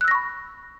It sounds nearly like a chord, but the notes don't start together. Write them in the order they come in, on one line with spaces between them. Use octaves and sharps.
F#6 E6 A#6 C#6 B5